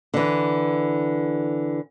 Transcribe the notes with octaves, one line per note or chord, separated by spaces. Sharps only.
D3 E3